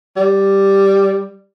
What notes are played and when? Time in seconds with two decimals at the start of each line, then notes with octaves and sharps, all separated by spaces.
0.17 G3